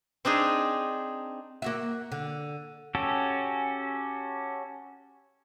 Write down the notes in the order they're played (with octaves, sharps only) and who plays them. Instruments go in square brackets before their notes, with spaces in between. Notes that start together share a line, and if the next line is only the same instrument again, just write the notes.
[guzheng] C4 D4 D#4 G#4
[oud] A#3 F#4 E5
D3
[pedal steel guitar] C#4 F#4 G4 A4